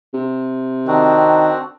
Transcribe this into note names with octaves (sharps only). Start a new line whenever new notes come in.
C3
D#3 C4 D4 F#4